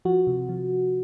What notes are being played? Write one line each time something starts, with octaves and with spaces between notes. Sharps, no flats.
F3 F#4
C3
F3